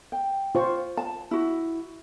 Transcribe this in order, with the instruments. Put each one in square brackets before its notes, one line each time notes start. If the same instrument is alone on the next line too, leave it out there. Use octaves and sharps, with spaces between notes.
[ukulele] G5
[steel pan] F4 C5 C#6
[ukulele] A5
E4 F#4